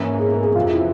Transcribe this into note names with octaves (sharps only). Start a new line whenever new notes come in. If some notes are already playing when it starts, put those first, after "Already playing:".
Already playing: G#2 E3 A#3 C#4
G#4
A#4
G#4
F2 C3 E3 F4
E4